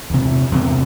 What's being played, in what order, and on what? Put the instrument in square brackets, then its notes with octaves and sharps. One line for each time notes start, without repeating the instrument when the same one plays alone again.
[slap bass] E2 C3
E2 C3